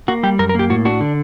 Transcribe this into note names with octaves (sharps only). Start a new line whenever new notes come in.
A#3 F#4
G3 G4
F#2 A#4
A#4
A#3 G4
A2 F#4
D4 F#4
D3